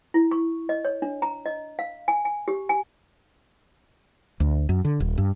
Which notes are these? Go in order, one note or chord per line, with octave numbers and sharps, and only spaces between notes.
E4
C#6
D#5
C#5
D4
A#5
D#5
F5
G#5
G#5
G4
G#5
D2
F#2
D3
D#1
G2